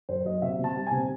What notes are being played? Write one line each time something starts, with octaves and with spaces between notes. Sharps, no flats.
F#2 C5
F#3 D#5
C3 E5
C3
A5
G3
C3 G#5